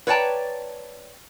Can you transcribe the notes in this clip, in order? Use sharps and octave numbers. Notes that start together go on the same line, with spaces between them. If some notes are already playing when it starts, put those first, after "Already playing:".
B4 C#5 D5 G5 A5 A#5